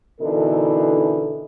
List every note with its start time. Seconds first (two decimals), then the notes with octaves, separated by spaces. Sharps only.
0.20 B2 D3 E3 D#4 A4 A#4